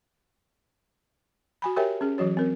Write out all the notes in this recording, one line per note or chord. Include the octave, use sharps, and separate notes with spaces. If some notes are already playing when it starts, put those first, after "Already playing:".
F#4 G#5 B5
G4 A#4 C#5 E5 G5 G#5
C#4 G#4
E3 F#3 F#4 C#5
C4 A#4